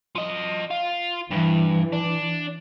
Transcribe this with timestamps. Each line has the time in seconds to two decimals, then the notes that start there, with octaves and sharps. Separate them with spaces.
0.15 F3 D#5
0.70 F4
1.31 G2 E3
1.93 D4